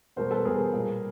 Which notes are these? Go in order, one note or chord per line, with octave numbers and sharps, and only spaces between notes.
E2 B2 G3 A#4 C5
A4 B4
E2 B2 G3 G#4 A#4
A#2 G3